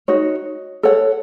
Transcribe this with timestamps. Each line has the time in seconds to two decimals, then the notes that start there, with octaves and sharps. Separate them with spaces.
0.08 D#4 F#4 C#5
0.83 A4 C#5 F#5